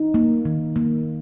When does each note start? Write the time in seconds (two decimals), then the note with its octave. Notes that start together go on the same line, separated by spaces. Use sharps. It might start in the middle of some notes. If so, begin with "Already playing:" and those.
Already playing: D#4
0.14 A#3
0.45 D#3
0.76 A#3